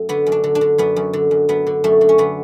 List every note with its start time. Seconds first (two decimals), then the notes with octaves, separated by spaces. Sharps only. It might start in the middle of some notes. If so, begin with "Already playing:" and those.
Already playing: F#2 A3
0.09 D3 B3
0.26 F#2
0.32 D4
0.44 D3
0.55 D4
0.61 D3
0.78 F#2 B3
0.96 F#2
1.13 D3
1.31 F#2
1.49 F#2 B3
1.67 D3
1.84 F#2 A3
2.01 D3
2.09 C#4
2.18 D3 B3